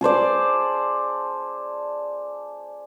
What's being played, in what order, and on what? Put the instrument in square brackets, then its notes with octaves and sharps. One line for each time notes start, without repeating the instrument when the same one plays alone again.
[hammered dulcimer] G#4 A4 C5 D5